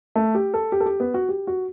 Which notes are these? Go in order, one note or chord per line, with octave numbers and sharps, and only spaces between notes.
A3
G4
A4
G4
A4
G4
B3
F#4
G4
F#4